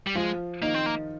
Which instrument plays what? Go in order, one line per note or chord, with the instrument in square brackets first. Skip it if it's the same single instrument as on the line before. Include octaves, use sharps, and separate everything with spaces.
[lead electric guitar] G3
[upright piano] F3 F4 [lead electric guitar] G#3
[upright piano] D#3 D#4 [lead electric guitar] A#3
[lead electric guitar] C4
A#3